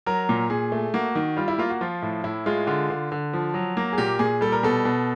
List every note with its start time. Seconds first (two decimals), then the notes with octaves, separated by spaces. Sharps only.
0.06 F#3 A#4
0.29 A#2
0.50 A#2 G#4
0.72 A3
0.94 A#3 F#4
1.15 D#3
1.37 G3 F4
1.48 E4
1.58 A#3 F4
1.70 F#4
1.81 F3 F4
2.02 A2
2.24 A2 E4
2.46 G#3 F4
2.67 D3 F4
2.90 D3
3.12 D3
3.33 F3
3.54 F#3
3.77 A#3
3.93 G#4
3.98 A#2 G4
4.19 A#2 G#4
4.41 G3 A4
4.52 A#4
4.63 B2 A4
4.85 B2